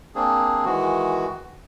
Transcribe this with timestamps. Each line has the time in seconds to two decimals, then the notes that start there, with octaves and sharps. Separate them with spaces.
0.15 A#3 C4 D4 G#4
0.65 D#3 E3 G#3 F#4